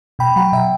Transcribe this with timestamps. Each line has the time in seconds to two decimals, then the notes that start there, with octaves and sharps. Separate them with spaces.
0.19 B2 G5 B5
0.36 F#3 F#5 A#5
0.52 B2 E5 G5